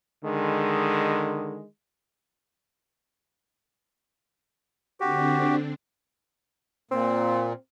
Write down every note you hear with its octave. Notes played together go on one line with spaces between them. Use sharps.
D3 D#3 G#3
D3 C4 D4 F#4 G4
A#2 C4